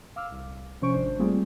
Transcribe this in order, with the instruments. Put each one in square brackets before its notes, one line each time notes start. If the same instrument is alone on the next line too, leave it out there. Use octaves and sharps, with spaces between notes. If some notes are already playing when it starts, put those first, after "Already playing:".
[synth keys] F5 D6 E6 F6
C2
C3 F3 C#4 C5 C#6 D7
G#1 D4 C5
G3 A3 A#3 C4 F4 G#4